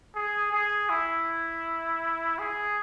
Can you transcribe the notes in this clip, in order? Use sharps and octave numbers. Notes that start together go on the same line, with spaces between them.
G#4
G#4
E4
G#4